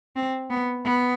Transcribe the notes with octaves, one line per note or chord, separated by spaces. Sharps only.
C4
B3
B3